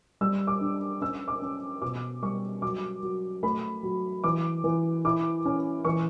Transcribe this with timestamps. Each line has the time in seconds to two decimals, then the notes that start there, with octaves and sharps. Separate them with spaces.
0.21 G3 E6
0.47 D6
0.61 D4
1.01 C#4 E6
1.28 D6
1.42 C#4
1.82 B2 D6
2.22 G3 C#6
2.62 F#3 D6
3.03 F#3
3.43 A3 B5
3.83 F#3
4.24 E3 D6
4.64 E3
5.05 E4 D6
5.45 C#4
5.85 E3 C#6